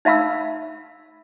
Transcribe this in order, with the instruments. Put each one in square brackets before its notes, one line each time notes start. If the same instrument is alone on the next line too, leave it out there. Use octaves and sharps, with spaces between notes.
[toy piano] D#4 E5 F5 B5 E6